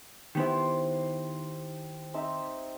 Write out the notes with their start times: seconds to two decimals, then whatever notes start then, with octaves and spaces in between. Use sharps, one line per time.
0.35 D#3 B3 E4 G4 C5
2.14 C4 D#4 E5